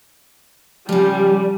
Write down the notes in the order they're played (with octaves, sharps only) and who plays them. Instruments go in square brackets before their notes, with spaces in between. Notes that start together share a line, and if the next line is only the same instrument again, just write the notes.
[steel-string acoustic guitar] C#3 F3 [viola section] G3